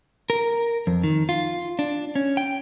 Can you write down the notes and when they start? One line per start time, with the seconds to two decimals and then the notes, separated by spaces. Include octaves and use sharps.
0.30 A#4
0.87 F2
1.03 D#3
1.29 F4
1.79 D4
2.15 C#4
2.37 G5